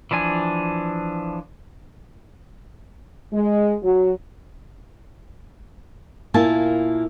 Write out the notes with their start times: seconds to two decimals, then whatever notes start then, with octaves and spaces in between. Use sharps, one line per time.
0.11 E3 F3 D4 G#5
3.33 G#3
3.83 F#3
6.34 A#2 A#3 E4 G#5 A5